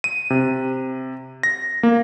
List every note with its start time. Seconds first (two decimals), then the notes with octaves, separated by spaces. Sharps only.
0.04 D#7
0.30 C3
1.43 A#6
1.83 A#3